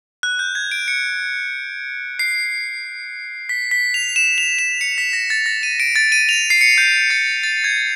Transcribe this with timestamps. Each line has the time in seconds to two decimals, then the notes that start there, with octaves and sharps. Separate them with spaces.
0.23 F#6
0.39 G6
0.55 G#6
0.71 D7
0.88 C#7
2.19 C7
3.49 B6
3.71 B6
3.94 F7
4.16 E7
4.38 F7
4.59 E7
4.81 C#7
4.98 B6
5.13 A#6
5.30 A6
5.46 A#6
5.63 D#7
5.80 D7
5.96 A6
6.12 D#7
6.29 F7
6.50 C7
6.61 C#7
6.78 G6
7.10 A6
7.43 A6
7.64 G#6